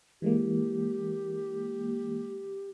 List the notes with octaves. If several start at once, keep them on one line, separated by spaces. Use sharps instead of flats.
E3 G#3 A#3 G4